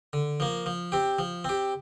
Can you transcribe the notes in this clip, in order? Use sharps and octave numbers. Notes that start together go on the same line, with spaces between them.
D3
F3 A#3
F3
C4 G4
F3
C4 G4